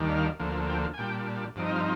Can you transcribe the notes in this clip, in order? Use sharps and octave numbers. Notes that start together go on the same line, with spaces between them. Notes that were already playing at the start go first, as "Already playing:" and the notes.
Already playing: D#2 D#3 G3 D4
F5
D2 D3 F3 A#3
G5
G#5
A#2 G3 D4 G5
G2 F3 C4 D#4 D5
D#5
F5